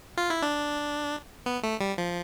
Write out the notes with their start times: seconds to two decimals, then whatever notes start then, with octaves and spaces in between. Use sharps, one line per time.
0.17 F4
0.30 E4
0.42 D4
1.46 B3
1.63 A3
1.81 G3
1.98 F3